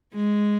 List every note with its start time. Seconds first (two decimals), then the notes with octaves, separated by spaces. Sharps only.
0.14 G#3